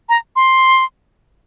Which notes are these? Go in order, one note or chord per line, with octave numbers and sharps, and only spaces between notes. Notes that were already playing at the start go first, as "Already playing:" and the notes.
A#5
C6